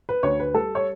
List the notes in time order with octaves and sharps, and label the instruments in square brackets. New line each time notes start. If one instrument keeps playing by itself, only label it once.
[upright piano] B4
D2 C#5
B4
G3 A4
C#5